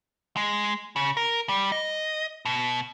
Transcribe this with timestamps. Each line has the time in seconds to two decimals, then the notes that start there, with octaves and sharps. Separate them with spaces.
0.37 G#3
0.96 C#3
1.17 A#4
1.49 G3
1.72 D#5
2.45 B2